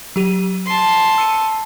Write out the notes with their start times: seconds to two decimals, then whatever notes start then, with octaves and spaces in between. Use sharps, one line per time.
0.16 F#3 G4 D#7
0.66 A5 C6
1.18 E6 C#7 D#7